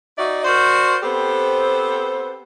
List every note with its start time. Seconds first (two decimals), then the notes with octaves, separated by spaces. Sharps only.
0.18 D#4 F#4 D5 E5
0.44 F#4 A#4 C5 D5
1.02 B3 C4 G4 A4 C5